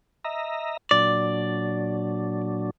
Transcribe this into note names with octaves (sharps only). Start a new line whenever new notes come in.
D#5 E5 A#5
A#2 F#3 D4 D5